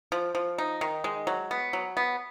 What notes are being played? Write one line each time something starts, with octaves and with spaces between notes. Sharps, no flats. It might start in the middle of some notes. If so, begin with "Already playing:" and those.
F3
F3
D#4
D#3
G#3
F#3
B3
F#3
B3